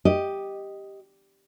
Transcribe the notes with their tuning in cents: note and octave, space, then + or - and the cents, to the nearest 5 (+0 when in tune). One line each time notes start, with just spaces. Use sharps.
G4 +0 D#5 +0